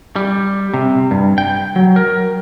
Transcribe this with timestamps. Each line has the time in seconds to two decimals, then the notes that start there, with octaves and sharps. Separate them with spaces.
0.16 G3
0.74 C3
1.11 G2
1.38 G5
1.76 F#3
1.96 A#4